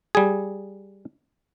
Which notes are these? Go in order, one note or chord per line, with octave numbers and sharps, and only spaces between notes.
G3 G#4